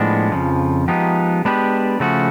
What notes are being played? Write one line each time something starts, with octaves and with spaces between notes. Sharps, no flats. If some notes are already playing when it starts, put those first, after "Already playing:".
Already playing: A2 F3 G#3 B3 D4
F2 C#3 F3
F3 G#3 B3 D#4 G4
G#3 B3 D4 G4 B4
C#3 F3 A3 C#4 F#4